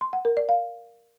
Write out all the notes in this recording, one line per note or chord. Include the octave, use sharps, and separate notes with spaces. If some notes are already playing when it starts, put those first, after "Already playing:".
C6
F#5
A#4
D5
F5